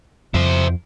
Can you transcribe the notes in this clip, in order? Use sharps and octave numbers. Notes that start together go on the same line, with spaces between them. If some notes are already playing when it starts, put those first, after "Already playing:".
F2 E4 C5